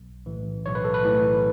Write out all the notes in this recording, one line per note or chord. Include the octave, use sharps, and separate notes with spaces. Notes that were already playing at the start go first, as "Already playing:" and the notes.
Already playing: B1
A2 E3
B1 C#5
B4
A4
B4
A2 E3